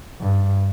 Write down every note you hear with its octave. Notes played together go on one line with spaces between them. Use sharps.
G2